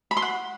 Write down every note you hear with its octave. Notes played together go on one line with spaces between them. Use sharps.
B5
C6
F#5